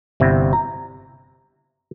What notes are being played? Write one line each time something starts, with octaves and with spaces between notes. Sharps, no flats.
G1 C3 E4
A#5